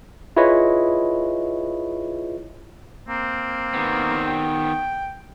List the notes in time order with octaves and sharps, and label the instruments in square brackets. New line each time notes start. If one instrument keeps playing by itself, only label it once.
[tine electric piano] E4 F4 G#4 B4 C#5 D#5
[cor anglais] A#3 [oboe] C4
[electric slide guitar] D#3 B3
[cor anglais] G5